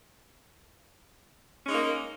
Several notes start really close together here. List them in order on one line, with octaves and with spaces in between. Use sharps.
C#4 G#3 D#4 A#3